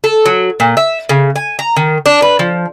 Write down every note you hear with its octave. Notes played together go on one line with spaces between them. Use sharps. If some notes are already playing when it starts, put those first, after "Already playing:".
A4
F#3
A#2
E5
C#3
G#5
A#5
D#3
D4
B4
F3